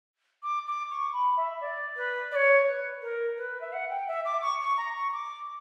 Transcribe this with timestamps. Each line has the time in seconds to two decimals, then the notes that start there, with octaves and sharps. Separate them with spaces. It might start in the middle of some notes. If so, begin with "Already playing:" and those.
0.43 D6
0.67 D6
0.90 C#6
1.13 B5
1.37 E5
1.61 D5
1.96 B4
2.31 D5
2.35 C#5
2.66 B4
3.02 A#4
3.37 B4
3.61 E5
3.73 F#5
3.90 G5
4.08 E5
4.25 D6
4.42 C#6
4.61 C#6
4.77 A#5
4.95 C#6
5.12 D6